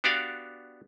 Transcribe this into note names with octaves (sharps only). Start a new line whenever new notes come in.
B3 D4 F#4 G4 D5 F5